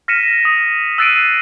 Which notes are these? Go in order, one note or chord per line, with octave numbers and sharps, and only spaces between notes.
F6 A#6 B6 C#7 D#7 E7
D#6
E6 F#6 A6 C7 D7 D#7